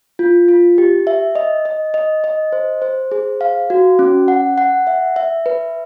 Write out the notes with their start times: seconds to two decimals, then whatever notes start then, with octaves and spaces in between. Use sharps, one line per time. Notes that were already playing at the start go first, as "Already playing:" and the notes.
0.19 F4
0.48 F4
0.78 G4
1.07 E5
1.35 D#5
1.65 D#5
1.94 D#5
2.24 D#5
2.52 C5
2.82 C5
3.12 G#4
3.41 F5
3.70 F#4
3.99 C#4
4.28 F#5
4.58 F#5
4.87 E5
5.16 E5
5.46 B4